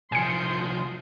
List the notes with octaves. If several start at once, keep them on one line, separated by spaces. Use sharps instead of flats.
C2 F3 G#5 C6 D#6 G6 C#7